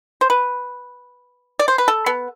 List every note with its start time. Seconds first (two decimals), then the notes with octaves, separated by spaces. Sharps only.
0.21 C5
0.30 B4
1.59 D5
1.68 C5
1.78 B4
1.88 A4
2.06 B3